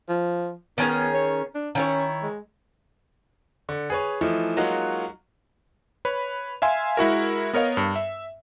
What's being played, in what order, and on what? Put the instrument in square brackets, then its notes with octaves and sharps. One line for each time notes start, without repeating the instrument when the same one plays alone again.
[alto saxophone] F3
[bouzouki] D#3 C#4 G#4 [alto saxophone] B3
[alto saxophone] C#5
D4
[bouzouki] D#3 E4 C#5 [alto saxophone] C#4
[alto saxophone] G#3
[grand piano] D3
G#4 B4 C#5
E3 F3 A3 D#4
F#3 G#3 A#3 D#4 F4 F#4
[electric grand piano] B4 C#5 B5
E5 F5 G#5 C6
G#3 E4 F#4 A#4
B3 A#4 C#5 D#5 F5
G2
E5